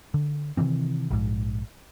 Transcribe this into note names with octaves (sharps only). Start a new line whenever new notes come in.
D3
C3 D#3 E3 C4
A#1 G#2